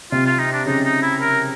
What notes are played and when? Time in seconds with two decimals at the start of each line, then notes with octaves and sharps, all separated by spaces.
0.12 C3 F4
0.26 F4
0.39 D#4
0.52 D4
0.66 C#3 D#4
0.85 D#4
1.02 E4
1.20 A#4